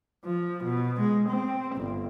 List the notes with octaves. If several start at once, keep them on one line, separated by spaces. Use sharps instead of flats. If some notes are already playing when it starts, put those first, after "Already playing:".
F3
B2
G#3
C4
G1